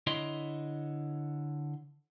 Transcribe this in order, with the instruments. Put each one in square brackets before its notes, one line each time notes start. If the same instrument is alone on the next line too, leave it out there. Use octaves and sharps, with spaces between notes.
[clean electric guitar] D3 E4 C#5 D#5 C6